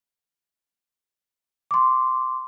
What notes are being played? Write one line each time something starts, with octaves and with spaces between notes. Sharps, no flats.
C6 D6